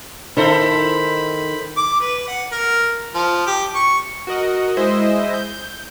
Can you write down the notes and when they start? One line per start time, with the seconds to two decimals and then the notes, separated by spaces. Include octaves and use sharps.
0.37 D#3 D#4 E4 A4 C5 B5
1.77 D6
2.01 B4
2.28 F#5
2.52 A#4
3.15 F3
3.47 G4
3.75 C#6
4.27 F#4 A#4 D#5 F#5
4.77 G#3 E4 C5 D#5 E5
5.34 G6